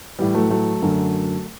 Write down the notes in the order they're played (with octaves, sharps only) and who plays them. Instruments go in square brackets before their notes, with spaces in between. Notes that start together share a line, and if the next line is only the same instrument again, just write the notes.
[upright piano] A2 E3 G3
F#3 A3
F#3 A3
F#2 D3